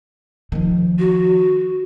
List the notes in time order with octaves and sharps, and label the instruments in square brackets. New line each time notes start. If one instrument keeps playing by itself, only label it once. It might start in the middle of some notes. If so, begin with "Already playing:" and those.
[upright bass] D#3 F3
[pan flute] F#4